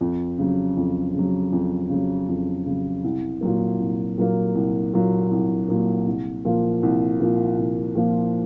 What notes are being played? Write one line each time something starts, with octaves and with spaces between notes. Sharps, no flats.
F2
C#3 F#3
F2
C#3 F#3
F2
C#3 F#3
F2
C#3 F#3
C2
A#2 F#3 A#3
C2
A#2 F#3 A#3
C2
A#2 F#3 A#3
C2
A#2 F#3 A#3
C2
A#2 F3 A#3
C2
A#2 F3 A#3
C2
A#2 F3 A#3